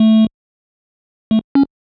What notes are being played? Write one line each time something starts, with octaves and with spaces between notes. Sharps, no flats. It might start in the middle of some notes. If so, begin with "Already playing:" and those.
Already playing: A3
A3
C#4